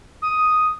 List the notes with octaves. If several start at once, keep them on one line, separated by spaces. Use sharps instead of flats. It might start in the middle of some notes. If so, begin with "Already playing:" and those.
D#6